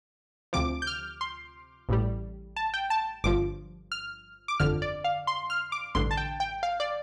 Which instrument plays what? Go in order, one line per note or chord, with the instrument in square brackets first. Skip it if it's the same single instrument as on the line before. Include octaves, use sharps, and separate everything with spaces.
[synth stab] D2 C3 F3 D6
G6
F6
C6
A1 A2 G3
A5
G5
A5
G1 G2 F3 D6
F6
D6
G1 F2 D3 F6
D5
F5
C6
F6
D6
A1 G2 D3 C6
A5
G5
G5
F5
D5